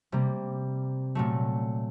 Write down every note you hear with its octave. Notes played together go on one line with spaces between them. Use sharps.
C3 G3 A#3
A#2 F#3 A3